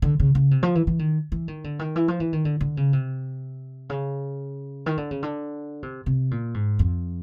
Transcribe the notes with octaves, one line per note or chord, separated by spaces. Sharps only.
D3
C#3
C#3
C3
F3
E3
E3
D#3
E3
D#3
D3
D#3
E3
F3
E3
D#3
D3
D3
C#3
C3
C#3
D#3
D3
C#3
D3
C3
C3
A#2
G#2
F2